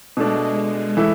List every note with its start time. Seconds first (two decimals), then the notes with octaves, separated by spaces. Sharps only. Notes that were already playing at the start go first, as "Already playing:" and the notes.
0.17 B2 G#3 A3 D4
0.57 G#3
0.97 E3 A3 E4